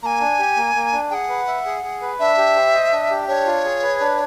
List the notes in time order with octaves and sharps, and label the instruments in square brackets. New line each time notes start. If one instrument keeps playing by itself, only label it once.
[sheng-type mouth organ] A#3 [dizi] G#5 A#5
[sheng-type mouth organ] D4
G4
A#3
A#3
D4
[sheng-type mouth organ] G#4 [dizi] F#5 G5
[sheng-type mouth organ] B4
E5
G#4
G#4
B4
[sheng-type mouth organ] D4 [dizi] E5
[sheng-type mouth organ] G4
C5
D#5
D4
G4
[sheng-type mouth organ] D4 [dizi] C#5
[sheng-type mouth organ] F4
G#4
B4
D4